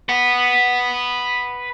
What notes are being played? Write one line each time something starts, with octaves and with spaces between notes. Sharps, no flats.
B4 F#5